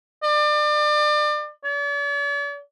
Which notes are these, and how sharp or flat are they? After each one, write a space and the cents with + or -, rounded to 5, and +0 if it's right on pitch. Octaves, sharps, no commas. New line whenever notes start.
D5 +35
D5 -45